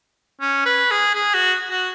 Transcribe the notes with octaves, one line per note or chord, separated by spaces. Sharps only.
C#4
B4
G#4
G#4
F#4
F#4